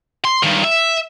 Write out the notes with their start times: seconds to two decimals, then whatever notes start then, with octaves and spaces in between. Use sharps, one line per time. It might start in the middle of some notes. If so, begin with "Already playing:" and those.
0.24 C6
0.43 G2 D#3
0.64 E5